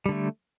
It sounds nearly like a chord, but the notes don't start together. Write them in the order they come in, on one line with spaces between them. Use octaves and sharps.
G3 D3 A3